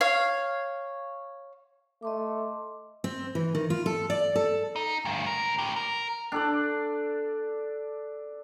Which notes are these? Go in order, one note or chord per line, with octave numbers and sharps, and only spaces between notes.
C#5 F5
A3 D#5 C6 D6
C4
E3
D#3
F4
A4
D5
A4
D#4
D2 G2
C#2 A#4
A2 G4
A#4
D4 A4 D5